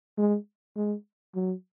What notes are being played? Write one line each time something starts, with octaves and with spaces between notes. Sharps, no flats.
G#3
G#3
F#3